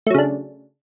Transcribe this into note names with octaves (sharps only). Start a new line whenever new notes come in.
C#3 F#3 A3 D4